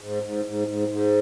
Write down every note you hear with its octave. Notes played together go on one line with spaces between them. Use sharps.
G#2
G#2
G#2
G#2
G#2